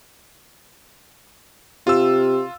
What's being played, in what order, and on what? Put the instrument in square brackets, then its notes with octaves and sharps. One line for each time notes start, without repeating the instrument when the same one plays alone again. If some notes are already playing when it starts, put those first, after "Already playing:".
[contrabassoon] C3 [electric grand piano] F4 E6